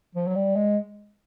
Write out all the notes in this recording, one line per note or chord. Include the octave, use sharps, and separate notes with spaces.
F3
F#3
G3
G#3